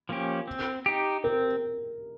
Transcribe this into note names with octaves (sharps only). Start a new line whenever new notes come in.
F3 A#3 C#4 G4
C4
D#4 G4
C4 A#4